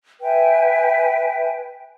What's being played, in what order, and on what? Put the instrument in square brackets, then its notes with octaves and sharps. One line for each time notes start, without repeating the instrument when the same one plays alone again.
[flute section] B4 E5 G5 G#5